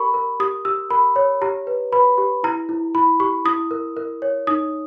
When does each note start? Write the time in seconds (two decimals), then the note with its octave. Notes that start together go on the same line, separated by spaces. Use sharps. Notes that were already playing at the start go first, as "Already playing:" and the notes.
Already playing: G4 A#4 B5 C#6
0.14 A#4
0.40 G4 D#6
0.65 G4 E6
0.90 A#4 B5
1.16 C#5
1.42 G4 A#5
1.67 B4
1.92 B4 B5
2.18 G4
2.43 E4 A#5
2.69 E4
2.95 E4 B5
3.20 G4 C#6
3.45 E4 D#6
3.71 A#4
3.97 A#4
4.22 C#5
4.47 D#4 D#6